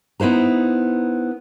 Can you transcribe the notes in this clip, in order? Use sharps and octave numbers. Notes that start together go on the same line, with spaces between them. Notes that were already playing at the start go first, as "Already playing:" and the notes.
B3 D#4 E4 C5 A#5